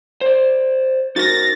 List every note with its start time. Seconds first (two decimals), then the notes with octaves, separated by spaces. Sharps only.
0.21 C5 D5
1.16 D#4 F#4 A#4 A6 A#6